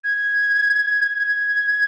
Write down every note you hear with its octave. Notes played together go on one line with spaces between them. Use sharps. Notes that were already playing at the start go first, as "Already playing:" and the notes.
G#6
G#6